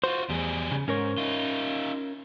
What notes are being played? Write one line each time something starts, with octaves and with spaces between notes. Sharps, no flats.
F4 F#4 C5
E2 G3 G#4
C#3
G#2 C#4 A#4 C#5
D#4 F4